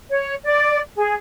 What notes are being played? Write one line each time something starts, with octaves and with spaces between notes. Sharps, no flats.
C#5
D5
G#4